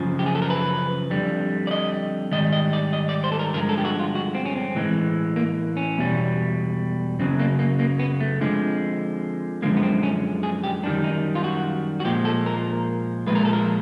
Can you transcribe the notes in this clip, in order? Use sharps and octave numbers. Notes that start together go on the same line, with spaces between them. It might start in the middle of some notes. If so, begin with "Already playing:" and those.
Already playing: F#2 C#3 F3
G4
G#4
A4
A#4
B4
F2 D3 G3
D5
D#5
G#2 D#3 G3 D#5
D#5
D5
D#5
D5
C5
A4
A#4
G2 D3 F3 G#3 A#4
A4
G4
F#4
F4
F#4
C4
C#4
C4
A2 E3 G#3
A#3
C#4
E2 B2 G3
F#2 C#3 F#3 C4
A#3
A#3
A#3
B3
A3
F2 D3 F3 G#3
F#2 D3 F3 G#3 A#3
B3
C4
C#4
G#4
G4
F#2 D#3 G3 D4
D#4
F4
F#4
F#4
A#2 F3 G#3 G4
A4
A#4
A#2 F3 G#3 B4
A#4
A4
A#4